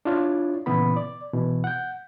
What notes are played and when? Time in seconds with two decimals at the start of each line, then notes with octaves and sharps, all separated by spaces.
0.05 D4 E4 F4 C#5
0.66 A#2 C#3 E3 B3 B5
0.96 D5
1.33 B2 E3
1.64 F#5 G6